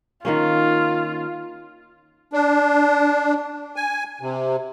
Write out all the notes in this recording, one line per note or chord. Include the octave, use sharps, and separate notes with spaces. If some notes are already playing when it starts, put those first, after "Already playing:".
D#3 A#3 C#4 F4
D4
G#5
C3